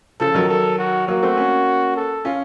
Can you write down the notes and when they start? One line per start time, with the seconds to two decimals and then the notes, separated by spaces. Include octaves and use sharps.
0.20 C#3 F3 A4
0.34 D#3 F#3
0.49 A4
0.79 F#4
1.07 F#3 A#3 F#4
1.23 A3 C4
1.37 A#3 C#4
1.96 A4
2.25 C#4 F4